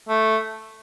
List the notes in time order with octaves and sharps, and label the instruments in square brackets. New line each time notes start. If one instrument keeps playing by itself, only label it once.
[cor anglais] A3